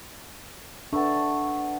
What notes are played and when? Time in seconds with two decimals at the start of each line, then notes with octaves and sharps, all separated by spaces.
0.93 A3 B3 D4 A5